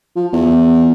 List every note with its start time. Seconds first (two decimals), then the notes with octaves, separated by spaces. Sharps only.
0.16 F3
0.33 E2